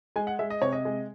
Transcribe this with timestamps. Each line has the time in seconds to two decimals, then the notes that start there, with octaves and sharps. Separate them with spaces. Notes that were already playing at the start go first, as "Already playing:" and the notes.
0.16 G#3 G#5
0.27 F#5
0.39 G#3 E5
0.50 D#5
0.62 C3 C#5
0.72 D#5
0.85 G#3